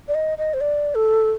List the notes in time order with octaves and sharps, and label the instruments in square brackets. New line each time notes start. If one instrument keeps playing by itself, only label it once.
[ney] D5
D#5
D#5
C5
D5
A4